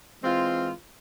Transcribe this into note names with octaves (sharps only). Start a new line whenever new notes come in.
E3 G#3 C4 F4